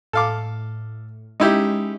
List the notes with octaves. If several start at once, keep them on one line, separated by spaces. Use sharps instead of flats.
A2 A4 F5 D6
G#3 C#4 D#4 E4 G4